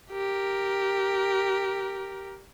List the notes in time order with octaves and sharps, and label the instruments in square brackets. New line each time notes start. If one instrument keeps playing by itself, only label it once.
[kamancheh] G4 A#4